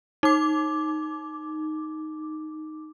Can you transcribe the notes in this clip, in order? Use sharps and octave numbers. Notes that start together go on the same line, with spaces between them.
D#4 D6